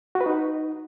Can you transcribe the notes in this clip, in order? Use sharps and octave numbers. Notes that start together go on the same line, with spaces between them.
F#4
B4
D#4